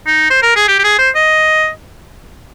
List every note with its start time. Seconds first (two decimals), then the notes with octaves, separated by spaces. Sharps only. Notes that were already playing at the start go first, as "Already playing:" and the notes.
0.07 D#4
0.30 C5
0.43 A#4
0.56 G#4
0.68 G4
0.79 G4
0.84 G#4
0.99 C5
1.15 D#5